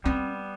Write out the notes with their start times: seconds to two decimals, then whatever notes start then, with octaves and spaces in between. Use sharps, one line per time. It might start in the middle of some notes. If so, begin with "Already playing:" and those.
0.04 G3 B3 C4